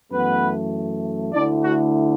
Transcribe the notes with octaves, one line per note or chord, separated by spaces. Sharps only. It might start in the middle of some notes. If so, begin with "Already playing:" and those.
F#2 E3 A3 B3 B4
D2 D3 A3 D4 E4 D5
F#4